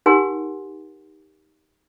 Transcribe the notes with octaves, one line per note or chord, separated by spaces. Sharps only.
D#4 G4 A#4 F#5 G#5 C6